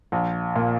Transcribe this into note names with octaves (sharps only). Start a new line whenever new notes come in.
A#1
A#2